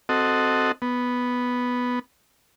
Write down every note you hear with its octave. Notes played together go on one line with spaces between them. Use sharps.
C4 F#4 A4 D#5
B3